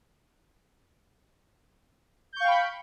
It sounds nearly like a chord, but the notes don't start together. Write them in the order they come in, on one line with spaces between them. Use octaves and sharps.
G6 C#6 F5 G5 B5